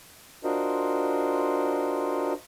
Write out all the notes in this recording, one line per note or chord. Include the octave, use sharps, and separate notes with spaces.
D4 F4 F#4 A#4 C5 D#5